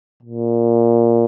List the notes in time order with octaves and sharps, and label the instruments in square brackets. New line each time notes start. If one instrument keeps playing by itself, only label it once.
[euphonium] A#2